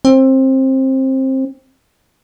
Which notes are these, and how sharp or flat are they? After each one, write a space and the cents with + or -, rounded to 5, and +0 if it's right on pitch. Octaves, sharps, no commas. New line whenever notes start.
C4 +20